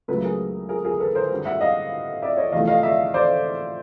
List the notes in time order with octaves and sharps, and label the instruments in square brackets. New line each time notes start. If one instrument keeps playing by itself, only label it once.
[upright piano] C#2 C#3 F#3 A3 A4 B4
G#4 A#4
G#4 A#4
G#4 A#4
A4 B4
A#4 C5
G2 D3 G3
E5 F#5
D#5 F5
D5 E5
C#5 D#5
E2 C3 F3 A3 D#5 F5
D#5 F5
D5 E5
C5 D5